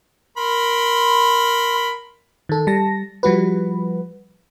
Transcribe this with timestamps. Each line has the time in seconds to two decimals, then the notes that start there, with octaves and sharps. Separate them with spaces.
0.37 A#4 B5 C6
2.49 D#3 A4
2.67 G3 A5 A#6
3.23 F3 G3 F#4 B4